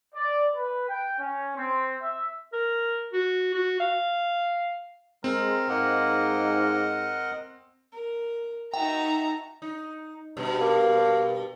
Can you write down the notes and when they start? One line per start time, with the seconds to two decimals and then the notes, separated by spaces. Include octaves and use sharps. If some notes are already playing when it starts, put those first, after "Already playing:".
0.15 D5
0.55 B4
0.88 G5
1.19 C#4
1.56 C4
2.01 E5
2.53 A#4
3.13 F#4
3.54 F#4
3.80 F5
5.24 G#3 C4 A#4
5.69 G#2 A#3 A#4 D#5 F#5
7.92 A#4
8.74 D#4 F#4 E5 G5 A5 A#5
9.62 D#4
10.37 G2 B2
10.61 A#3